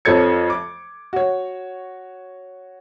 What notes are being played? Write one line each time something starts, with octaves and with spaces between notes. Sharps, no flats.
F2 F3 A4 C#5 G#6 C#7
D6
F#4 C#5